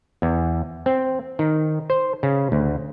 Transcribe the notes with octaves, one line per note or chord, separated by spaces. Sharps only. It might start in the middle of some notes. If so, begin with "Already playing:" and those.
E2
C4
D#3
C5
C#3
D2